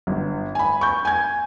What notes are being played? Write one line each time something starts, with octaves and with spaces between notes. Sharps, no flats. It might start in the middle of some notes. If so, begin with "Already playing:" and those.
G1
G#5 B5
C#6 G6
G#5 G#6